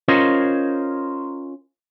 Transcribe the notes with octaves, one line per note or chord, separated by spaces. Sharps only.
C#4 F4 A#4 C5 C#5 D#5